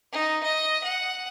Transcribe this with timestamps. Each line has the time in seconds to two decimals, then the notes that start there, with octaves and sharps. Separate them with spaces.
0.12 D#4
0.43 D#5
0.83 F#5